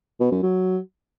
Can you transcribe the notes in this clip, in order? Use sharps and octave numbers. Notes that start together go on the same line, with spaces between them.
B2
F#2
F#3